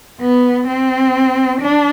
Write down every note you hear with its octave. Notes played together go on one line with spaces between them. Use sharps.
B3
C4
D4